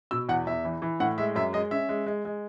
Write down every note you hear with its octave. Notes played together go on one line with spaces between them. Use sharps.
B2 E6
E2 F#5
E2 E5
E3
E3
A2 F#5
G#3 E5
F#2 E5
G#3 D#5
C#4 E5
G#3
G#3
G#3